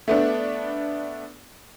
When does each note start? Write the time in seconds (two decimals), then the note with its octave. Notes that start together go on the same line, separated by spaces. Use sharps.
0.08 A3 B3 D4